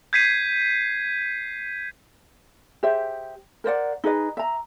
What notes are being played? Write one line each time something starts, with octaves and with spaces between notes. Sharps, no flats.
G6 G#6 B6 C7 D#7
G4 G#4 C5 E5
A#4 C5 D5 F#5
D#4 G#4 B4 D#5
E5 A#5